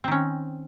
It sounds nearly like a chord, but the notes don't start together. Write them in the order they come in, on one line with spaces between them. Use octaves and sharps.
C4 D#3 C#4